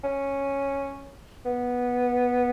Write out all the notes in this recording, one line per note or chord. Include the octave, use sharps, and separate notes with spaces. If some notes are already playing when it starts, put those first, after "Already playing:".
C#4
B3